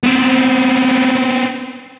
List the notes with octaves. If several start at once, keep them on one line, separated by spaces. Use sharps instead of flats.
B3 C4